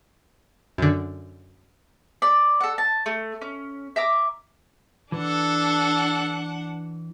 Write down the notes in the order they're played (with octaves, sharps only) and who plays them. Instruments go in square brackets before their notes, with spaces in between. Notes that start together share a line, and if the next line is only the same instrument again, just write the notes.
[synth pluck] F#2 D3
[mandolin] D5 B5
A4 F#5
A5
A3
C#4
E5 A#5 D6
[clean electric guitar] E3 B4 [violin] D4 F#5 [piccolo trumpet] A4